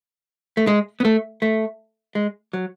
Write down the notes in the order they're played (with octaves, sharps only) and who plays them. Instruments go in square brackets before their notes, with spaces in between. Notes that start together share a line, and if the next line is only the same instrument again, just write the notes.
[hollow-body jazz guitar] A3
G#3
B3
A3
A3
G#3
F#3